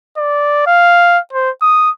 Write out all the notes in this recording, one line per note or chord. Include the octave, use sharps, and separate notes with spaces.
D5
F5
C5
D#6